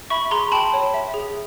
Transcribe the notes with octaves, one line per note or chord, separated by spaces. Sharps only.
E5 B5 C#6
G#4 A#5 C6
G5 A5 B5
C#5
E5
G#4